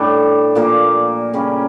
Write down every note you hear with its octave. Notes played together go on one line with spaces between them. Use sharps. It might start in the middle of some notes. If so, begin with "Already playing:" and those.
Already playing: A2 G3 D4 A4
A#2 F3 A#3
C#3 G3 C#4